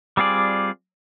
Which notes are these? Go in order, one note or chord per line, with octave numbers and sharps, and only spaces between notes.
G3 C4 F4 G#4 D5